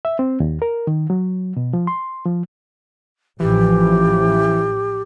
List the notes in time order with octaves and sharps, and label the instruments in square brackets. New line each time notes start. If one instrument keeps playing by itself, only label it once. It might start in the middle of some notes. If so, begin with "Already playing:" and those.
[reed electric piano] E5
C4
D#2
A#4
D#3
F#3
B2
F3
C6
F3
[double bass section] A1 F3 [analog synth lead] E3 [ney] G4